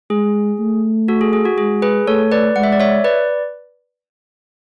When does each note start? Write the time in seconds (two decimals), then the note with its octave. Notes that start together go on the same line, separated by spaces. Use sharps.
0.10 G#3 G#4
0.60 A3
1.08 F#4 A4
1.21 G#4
1.33 G#4
1.45 F#4
1.58 G#3 G#4
1.82 G#4 B4
2.07 A3 A4 C#5
2.32 B4 D5
2.56 G#3 F#5
2.63 E5
2.72 D5
2.80 C#5 E5
3.04 B4 D5